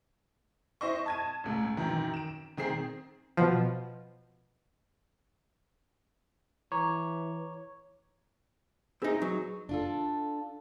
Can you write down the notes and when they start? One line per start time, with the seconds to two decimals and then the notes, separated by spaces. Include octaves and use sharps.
0.81 E4 C5 D#5 C#6
1.06 A5 G#6 D#7
1.44 C#2 A2
1.77 F#2 D#3 E3
2.14 D7 E7
2.57 D#3 C4 G#4 C7
3.37 B2 F3
6.72 E3 C#5 A#5 C#6 D6
9.02 C4 D#4 G#4 B4 E6
9.22 F#3
9.69 D4 F4 A4